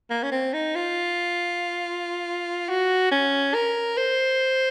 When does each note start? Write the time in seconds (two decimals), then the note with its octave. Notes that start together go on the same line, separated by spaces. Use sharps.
0.10 A#3
0.23 C#4
0.31 C4
0.53 D#4
0.75 F4
2.69 F#4
3.11 C#4
3.54 A#4
3.97 C5